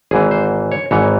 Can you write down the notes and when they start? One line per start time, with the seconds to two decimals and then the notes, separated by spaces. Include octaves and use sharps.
0.11 G#1 G#2 E3 G#4
0.31 C5
0.72 C#5
0.91 G#1 G#2 E3 C#5